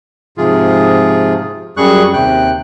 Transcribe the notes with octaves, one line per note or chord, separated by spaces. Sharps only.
G#2 C3 F3 F4 G#4
F#2 G3 G#4 C#6 F#6
D#2 C3 G5 F#6